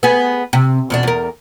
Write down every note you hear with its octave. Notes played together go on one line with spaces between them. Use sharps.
B3 G#4
C3
E2 B2 D4
E2 A#4